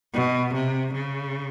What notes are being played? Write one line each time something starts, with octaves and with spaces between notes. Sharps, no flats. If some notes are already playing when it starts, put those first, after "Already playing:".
B2
C3
C#3